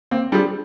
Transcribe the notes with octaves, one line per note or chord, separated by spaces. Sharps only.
A#3 C4
G3 D4 F4 G#4